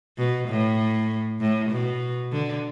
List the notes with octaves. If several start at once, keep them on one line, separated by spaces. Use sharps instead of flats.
B2
A2
A2
B2
D3